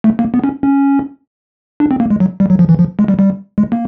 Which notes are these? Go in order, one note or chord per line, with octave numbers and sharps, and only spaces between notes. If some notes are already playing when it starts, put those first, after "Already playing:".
A3
A#3
B3
C#4
C#4
D4
C4
A#3
G#3
F#3
G3
F#3
F3
E3
F3
G#3
G3
G3
G#3
A#3